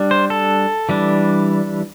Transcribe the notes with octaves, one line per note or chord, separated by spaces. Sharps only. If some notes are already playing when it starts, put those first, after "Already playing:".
Already playing: G3 D4
C5
A4
E3 G3 D4